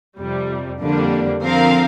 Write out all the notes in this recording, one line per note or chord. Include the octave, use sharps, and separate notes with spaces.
F2 C3 G3
F2 D3 G3 A#3 D4
D3 F3 C4 A#4 F5